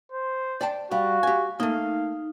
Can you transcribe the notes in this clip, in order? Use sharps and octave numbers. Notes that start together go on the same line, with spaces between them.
C5
D5 G5 A5
G3 F#4 F5
G4 G#5
A3 A#3 D#4 F5